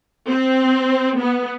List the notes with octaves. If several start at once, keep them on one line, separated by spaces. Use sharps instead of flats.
C4
B3